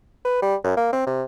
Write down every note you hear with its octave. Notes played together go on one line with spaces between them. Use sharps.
B4
G3
F#2
A#3
C4
C3